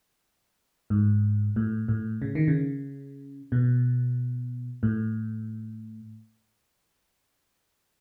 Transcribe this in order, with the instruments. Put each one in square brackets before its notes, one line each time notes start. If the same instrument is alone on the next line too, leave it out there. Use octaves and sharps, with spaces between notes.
[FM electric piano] G#2
A2
A2
C#3
D#3
C#3
B2
A2